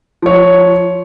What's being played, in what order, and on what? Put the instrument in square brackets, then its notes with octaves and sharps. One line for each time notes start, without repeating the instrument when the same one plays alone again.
[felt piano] F3 C#5